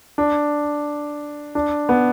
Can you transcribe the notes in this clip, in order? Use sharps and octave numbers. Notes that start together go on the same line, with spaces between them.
D4
D4
B3